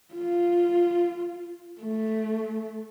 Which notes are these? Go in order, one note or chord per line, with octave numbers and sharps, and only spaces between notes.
F4
A3